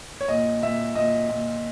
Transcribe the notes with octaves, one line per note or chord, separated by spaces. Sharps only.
C#5
A#2 D#5
A#2 E5
A#2 D#5
A#2